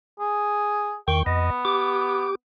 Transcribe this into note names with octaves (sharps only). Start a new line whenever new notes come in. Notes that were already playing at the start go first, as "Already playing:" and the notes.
G#4
E2 D#3 G5 C#6
F2 B3 D#5
G4 D6